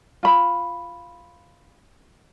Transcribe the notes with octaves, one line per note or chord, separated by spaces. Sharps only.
F4 B5